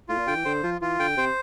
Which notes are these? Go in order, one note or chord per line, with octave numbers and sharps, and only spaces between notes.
A2 F4
A#2
D3 G5
E3
D3 C5
F3 F4
E3 F4
D3 G5
C3 C5